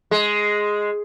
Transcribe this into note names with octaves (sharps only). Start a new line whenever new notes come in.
G#3